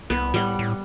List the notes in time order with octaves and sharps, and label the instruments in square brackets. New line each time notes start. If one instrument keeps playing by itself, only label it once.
[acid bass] C2 [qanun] B3
[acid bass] A2 [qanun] G3 F#5
[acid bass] A2